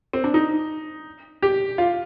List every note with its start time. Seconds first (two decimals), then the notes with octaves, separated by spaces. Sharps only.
0.13 C4
0.24 D4
0.34 D#4
1.42 G4
1.78 F4